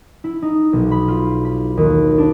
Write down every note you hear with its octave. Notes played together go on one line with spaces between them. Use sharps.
E4
D#4
B1
B5
F4
B5
D#2
D4